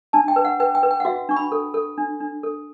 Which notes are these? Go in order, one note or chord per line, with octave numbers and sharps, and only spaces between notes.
D4 A5
G5
B4
F#5
B4 G5
G5
B4
G5
F#5
F#4 E5
D4 C#6
B5
A4
A4
D4
D4
A4